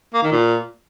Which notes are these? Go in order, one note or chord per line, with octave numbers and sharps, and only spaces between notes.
A#3
D#3
A#2